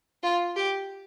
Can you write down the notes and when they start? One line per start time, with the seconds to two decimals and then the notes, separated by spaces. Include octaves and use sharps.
0.23 F4
0.56 G4